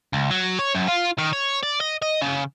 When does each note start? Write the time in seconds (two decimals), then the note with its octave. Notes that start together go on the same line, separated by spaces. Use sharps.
0.13 C#2
0.31 F#3
0.59 C#5
0.75 F#2
0.88 F4
1.18 D#3
1.33 C#5
1.63 D5
1.80 D#5
2.02 D#5
2.21 C#3